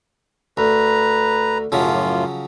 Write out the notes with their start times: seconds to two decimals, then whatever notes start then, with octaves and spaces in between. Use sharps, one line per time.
0.57 D2 B4 A#5
1.72 F#2 A2 C#3 F3 F#3 F4